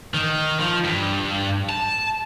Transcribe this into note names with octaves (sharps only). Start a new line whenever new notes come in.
D#3
F3
G2
A5